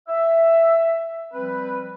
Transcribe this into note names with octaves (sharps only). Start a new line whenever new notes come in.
E5
F3 G3 C4 B4